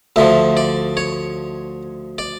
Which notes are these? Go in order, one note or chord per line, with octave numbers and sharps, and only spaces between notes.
D2 D3 F3 E5
D5
C#5
D5